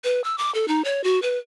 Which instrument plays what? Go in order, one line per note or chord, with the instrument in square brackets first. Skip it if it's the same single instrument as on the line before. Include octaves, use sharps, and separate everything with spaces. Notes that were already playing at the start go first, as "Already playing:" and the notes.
[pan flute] B4
E6
D6
A4
D#4
C#5
F#4
B4